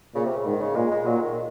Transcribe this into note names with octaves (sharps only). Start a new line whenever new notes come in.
A#2 C#3
C3
C#3
G#2 D#3
C#3
A#2 G#3
G#3
A#2 F#3
D#3